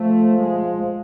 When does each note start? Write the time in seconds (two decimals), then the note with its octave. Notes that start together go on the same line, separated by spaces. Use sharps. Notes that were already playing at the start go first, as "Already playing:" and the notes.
Already playing: F3 A3
0.40 G#3